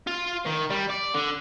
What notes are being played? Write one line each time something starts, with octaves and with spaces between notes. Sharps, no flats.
F4
D#3
G3
D5
D3